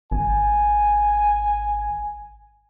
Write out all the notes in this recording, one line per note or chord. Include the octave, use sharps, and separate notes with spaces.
G#1 G#5